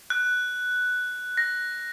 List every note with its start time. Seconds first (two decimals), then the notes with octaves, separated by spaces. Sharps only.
0.10 F#6
1.38 A#6